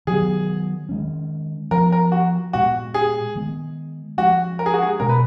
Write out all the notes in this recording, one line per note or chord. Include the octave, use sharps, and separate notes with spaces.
D#3 F#3 B3 G#4
D#3 G#3 C#4
F3 B3 A#4
A#4
F#4
A#2 G#3 B3 F#4
G#4
D#3 G#3 B3
F3 G#3 C#4 F#4
A#4
G#4
F#4
G#4
B2 G#3 C#4 A#4
B4